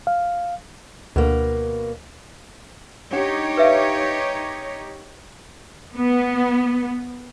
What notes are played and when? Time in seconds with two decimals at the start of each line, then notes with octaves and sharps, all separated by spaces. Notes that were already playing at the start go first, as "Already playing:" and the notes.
0.07 F5
1.16 D2 B2 A#3
3.13 D4 D#4 G4 C#5 F#5
3.57 B4 E5 F5
5.96 B3